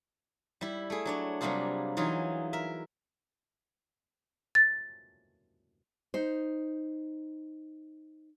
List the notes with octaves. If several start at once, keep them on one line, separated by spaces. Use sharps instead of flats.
G3 E4
A3 G#4
F#3 D4 C#5
C3 F#3 G3 A#3 F4 G#4
E3 F#3 D#4 F4 G#4
A#4 E5
A6
D#4 C5